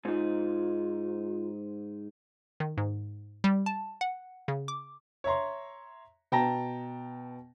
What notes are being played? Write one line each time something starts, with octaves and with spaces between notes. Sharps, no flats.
G#2 D#4 F4
D#3
G#2
G3
A5
F#5
C#3
D6
C#5 E5 A#5 C6
B2 G5 A5 A#5 A#6